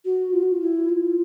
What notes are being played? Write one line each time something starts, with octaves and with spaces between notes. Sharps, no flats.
F#4
F4
F#4
F4
E4
F4